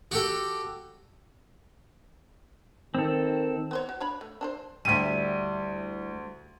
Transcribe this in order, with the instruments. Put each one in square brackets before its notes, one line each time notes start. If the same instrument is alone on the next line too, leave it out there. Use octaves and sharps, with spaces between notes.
[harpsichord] F#4 G4 A4
[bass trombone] D#3 [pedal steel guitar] C4 A4
[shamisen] B3 C5 C#5
F#4
D4 C#5 B5
A3
D4 A4 C5
[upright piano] D2 D#7 [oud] G3 E4